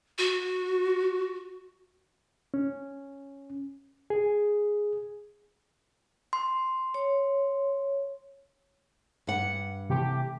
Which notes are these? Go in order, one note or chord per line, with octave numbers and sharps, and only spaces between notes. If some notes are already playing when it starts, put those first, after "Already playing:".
F#4
C#4
G#4
C6
C#5
G2 F#5
C3 E3 A3 G4